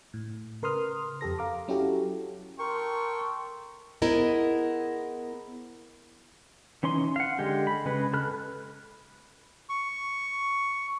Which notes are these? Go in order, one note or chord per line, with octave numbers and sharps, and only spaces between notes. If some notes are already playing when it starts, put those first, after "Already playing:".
A2
C#3 A#4 B4 C6 D#6 F6
F2 G4 A4 A#6
F5 A#5 D6
F#3 C#4 E4 F#4 G4 A4
A4 A#4 G5 C6 C#6
B3 E4 G#4 A#4 C5 D#5
E3 C#4 D#4 C6
F5 F#5
D3 G#3 G4
B5
C#3 G#3 B4 B5
A4 B5 F6 F#6
C#6